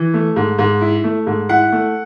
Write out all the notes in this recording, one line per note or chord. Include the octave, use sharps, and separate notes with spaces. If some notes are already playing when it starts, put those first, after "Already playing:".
Already playing: E3
A3
G#2
G#2
E4
A3
G#2
E4 F#5
A3